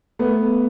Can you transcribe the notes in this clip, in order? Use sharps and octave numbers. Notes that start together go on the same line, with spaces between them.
A3 B3